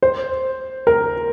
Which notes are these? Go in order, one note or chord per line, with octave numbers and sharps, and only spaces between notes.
C5
A#4